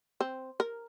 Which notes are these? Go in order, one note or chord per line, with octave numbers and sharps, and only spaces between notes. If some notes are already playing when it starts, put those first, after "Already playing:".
C4
A#4